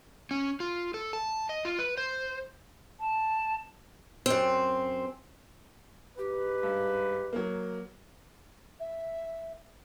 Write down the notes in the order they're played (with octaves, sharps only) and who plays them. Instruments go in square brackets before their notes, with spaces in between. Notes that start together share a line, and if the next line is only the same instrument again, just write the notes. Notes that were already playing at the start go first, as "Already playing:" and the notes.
[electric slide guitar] C#4
F4
A4
A5
D#5
F4
B4
C5
[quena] A5
[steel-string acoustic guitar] F#2 C4
[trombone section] G#2 D#4 B4 [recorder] G4
[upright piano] G2
F#3 A#3
[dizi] E5